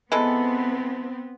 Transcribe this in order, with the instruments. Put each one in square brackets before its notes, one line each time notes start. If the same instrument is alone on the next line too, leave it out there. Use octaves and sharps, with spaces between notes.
[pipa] E3 G#3 A4 [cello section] B3 C4